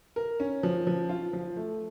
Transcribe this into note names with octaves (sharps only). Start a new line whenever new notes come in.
A#4
C#4
F3
F3
F4
F3
A3